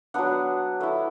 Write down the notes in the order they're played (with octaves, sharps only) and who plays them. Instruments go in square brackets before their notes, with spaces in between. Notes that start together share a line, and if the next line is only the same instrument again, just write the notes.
[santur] F#3 B3 D4 F#5
A3 E4